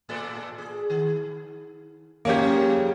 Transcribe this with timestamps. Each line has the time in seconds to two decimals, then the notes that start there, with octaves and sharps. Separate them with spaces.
0.09 A2 A4 D5
0.58 G#4
0.90 D#3
2.25 G#2 C#3 F3 A#3 C#4 G4